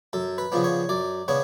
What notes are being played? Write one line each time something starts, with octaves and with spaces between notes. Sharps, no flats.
F#2 A4
B4
C#3 F3 B3 D4
C#5
F#2 D5
C#3 B3 D4 C#5